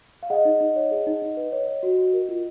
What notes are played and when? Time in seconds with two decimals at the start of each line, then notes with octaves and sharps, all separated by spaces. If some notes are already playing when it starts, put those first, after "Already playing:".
0.23 F5
0.30 G#4 D#5 F#5
0.45 D#4
0.61 D#4
0.76 C#5
0.91 G#4
1.07 D#4
1.22 D#4
1.37 B4
1.52 C#5
1.68 C#5
1.83 F#4
1.99 F#4
2.13 A#4
2.29 F4